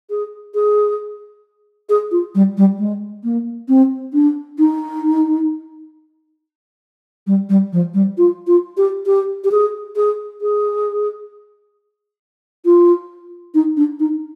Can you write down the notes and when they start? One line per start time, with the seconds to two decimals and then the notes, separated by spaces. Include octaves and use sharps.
0.10 G#4
0.54 G#4
1.89 G#4
2.11 F4
2.35 G3
2.57 G3
2.79 G#3
3.24 A#3
3.68 C4
4.13 D4
4.59 D#4
7.27 G3
7.49 G3
7.73 F3
7.94 G3
8.18 F4
8.47 F4
8.77 G4
9.06 G4
9.44 G4
9.51 G#4
9.96 G#4
10.41 G#4
12.65 F4
13.54 D#4
13.77 D4
14.00 D#4